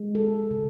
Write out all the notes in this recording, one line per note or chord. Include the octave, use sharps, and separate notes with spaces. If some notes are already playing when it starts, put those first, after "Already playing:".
Already playing: G#3
A4
C#3